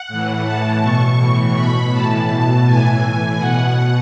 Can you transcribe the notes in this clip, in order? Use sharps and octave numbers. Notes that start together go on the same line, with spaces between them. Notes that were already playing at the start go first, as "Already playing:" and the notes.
Already playing: F#5
A2 E3
A2 E3 A5
B2 C#6
A2 E3 C#6
B2 B5
A2 E3 A5
B2 A5
A2 E3 G#5
A2 E3
B2 F#5